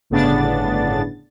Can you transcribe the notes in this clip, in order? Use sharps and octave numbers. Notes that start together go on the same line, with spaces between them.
G1 A2 C#3 B3 D4 A6